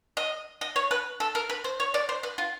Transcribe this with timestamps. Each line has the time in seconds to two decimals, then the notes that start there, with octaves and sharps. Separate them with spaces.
0.17 D#5
0.61 D#5
0.76 C#5
0.91 B4
1.20 A4
1.35 A#4
1.50 B4
1.64 C5
1.80 C#5
1.94 D5
2.09 C5
2.23 B4
2.38 F4